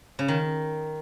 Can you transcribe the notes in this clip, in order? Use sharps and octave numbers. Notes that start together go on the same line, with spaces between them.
C#3
D#3